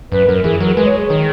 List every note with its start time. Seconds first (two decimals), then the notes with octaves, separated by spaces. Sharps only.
0.12 F#2 B4
0.28 F#2 A#4
0.44 E3 G#4
0.60 F#3 A#4
0.74 G#3 B4
0.86 C#5
0.98 G#4
1.10 D#3